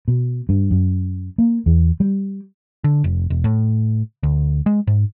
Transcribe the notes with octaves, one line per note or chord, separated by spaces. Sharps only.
B2
G2
F#2
A#3
E2
G3
D3
F1
E1
A2
D2
G#3
G#2